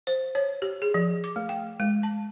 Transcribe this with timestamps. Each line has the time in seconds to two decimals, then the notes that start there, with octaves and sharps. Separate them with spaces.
0.07 C5
0.35 C#5
0.62 G4
0.82 G#4
0.94 F3
1.24 D6
1.36 A3
1.49 G5
1.80 G#3
2.03 A5